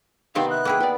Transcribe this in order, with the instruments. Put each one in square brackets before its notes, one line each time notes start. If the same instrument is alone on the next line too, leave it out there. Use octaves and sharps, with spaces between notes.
[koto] C3 D#3 C4 [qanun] B3 D#4 D6 [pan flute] G4 [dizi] F5
[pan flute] E5 [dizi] F#6
[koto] A#3 E4 G#4 [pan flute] G5
[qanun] B3 D5